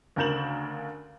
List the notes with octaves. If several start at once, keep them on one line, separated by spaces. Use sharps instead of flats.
D2 C#3 A#4 G6 E7 F#7